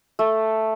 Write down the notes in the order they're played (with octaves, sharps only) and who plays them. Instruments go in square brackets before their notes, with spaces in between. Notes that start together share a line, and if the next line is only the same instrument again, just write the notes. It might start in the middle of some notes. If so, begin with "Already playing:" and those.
[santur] A3